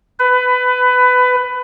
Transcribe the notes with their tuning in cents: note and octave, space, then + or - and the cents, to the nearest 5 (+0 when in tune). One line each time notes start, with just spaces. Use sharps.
B4 +20